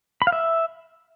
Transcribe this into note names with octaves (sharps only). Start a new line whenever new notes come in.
B5
F5
E5